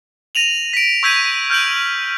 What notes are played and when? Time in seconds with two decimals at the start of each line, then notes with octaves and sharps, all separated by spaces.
0.35 A#6 D#7 F7 F#7
0.73 B6 D7
1.03 C#6 E6 G6 G#6 B6 D#7
1.50 F6 G6 D7 F#7